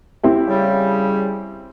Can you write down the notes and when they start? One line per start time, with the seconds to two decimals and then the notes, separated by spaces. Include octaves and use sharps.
0.23 C4 E4 G4
0.48 C#3 G3